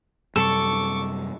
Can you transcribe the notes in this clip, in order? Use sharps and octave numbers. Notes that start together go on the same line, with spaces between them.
F#2 C3 G3 A4 C#6 D6